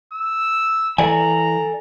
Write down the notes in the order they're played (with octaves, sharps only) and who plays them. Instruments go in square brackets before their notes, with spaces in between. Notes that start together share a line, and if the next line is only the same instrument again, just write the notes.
[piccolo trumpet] E6
[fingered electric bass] E3 [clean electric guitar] A4 D5 G#5 [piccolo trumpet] A#5